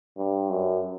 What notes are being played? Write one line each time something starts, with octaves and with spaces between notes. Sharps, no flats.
G2
F#2